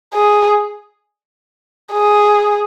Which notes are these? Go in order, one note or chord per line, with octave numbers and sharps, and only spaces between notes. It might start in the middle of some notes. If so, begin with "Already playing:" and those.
G#4
G#4